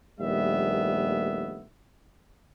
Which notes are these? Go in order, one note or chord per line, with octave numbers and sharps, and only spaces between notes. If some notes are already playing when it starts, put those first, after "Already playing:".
A#1 D#2 G3 A3 B3 E5